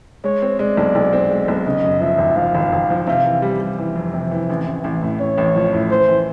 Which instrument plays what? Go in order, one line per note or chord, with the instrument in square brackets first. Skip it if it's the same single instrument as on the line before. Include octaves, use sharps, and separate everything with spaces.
[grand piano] G#3 [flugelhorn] C#5
[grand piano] C4
[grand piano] G#3 [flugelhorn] D5
[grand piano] B1
B1
C4
G#3
B1
[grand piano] C#3 [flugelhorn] D#5
[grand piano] F#2
[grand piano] F3 [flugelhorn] E5
[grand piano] G#1
[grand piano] F3 [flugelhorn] F5
[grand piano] G#1
G#1
F3
[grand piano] C3 [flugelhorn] F5
[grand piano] E3
G3
G3
E3
F2
C3
E3
A1
A1
A1
A2
[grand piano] A1 [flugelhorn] C#5
[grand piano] A1
F3
A2
[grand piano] E3 [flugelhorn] C5
[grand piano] E3